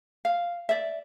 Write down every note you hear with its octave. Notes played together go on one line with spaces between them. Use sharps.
F5
D5 E5